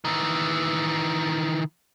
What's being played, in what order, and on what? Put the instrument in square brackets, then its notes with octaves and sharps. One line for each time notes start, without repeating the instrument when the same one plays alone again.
[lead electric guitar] D#3 E3